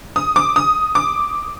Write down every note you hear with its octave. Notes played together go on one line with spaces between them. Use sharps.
D#6
D6
D#6
D6